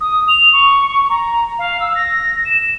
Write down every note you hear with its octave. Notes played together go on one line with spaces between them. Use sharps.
D#6
F7
C#6
A#5
F5
E6
A#6
E7